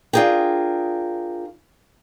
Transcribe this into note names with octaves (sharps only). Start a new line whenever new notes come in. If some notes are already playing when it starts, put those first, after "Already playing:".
D4 F4 F#4 G#4 A#4 G5